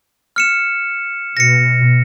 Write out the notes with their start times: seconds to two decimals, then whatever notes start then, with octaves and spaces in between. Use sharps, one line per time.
0.36 F6 C#7 E7
1.37 B2 A#6 C#7